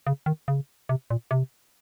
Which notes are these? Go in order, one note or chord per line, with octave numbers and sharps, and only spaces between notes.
C#3
D#3
C#3
C3
A#2
C3